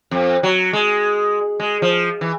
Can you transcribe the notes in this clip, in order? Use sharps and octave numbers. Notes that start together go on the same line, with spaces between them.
F2
F#3
G#3
G#3
F3
E3